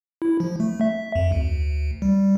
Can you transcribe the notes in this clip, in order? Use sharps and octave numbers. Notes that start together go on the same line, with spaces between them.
E4
F3
A3
E5
F2
D2
G3